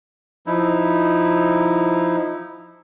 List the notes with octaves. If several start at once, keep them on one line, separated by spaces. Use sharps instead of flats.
F3 D#4 E4